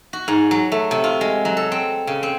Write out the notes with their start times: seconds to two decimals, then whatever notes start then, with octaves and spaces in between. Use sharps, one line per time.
0.13 F#4
0.28 G#2
0.51 F#3
0.72 A3
0.91 C3
1.04 F4
1.21 G#3
1.45 F#3
1.57 A4
1.72 C4
2.07 C#3
2.23 C4